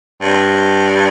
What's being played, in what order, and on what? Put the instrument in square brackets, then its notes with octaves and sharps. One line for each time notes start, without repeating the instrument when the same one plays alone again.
[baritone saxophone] G2